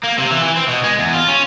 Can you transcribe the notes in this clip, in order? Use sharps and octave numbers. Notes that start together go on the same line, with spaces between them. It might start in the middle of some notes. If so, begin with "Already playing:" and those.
A#3
C3
E3
E3
C4
B2
G#3
E2
F4
C#4